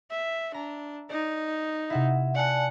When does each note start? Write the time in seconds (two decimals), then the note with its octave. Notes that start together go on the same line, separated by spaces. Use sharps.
0.11 E5
0.54 D4 A#5
1.10 D#4 D5
1.90 C3 E4 E5 F#5
2.35 D5 F#5 G#5 A5